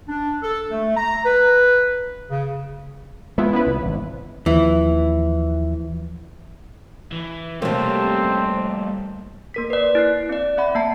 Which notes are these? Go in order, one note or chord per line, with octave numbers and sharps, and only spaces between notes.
D4
A4
A3
A#5
B4
C#3
G#3 B3 E4 F4
B3 C#4 E4 B4
C2
G#1 E3
D#2 E3 F3 E5
E3
F#2 C3 G3 A3 A#3 C4 C#5 A5
A#3 A#4 B6
B4 D5
E4 F#6 C7
C4 D5
C4 E5 F#5 B5
A#3 E5 A5 A#5 C7